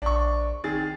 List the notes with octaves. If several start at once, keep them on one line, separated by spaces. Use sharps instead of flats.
A#1 D4 C#6
D#3 C4 G#4 A6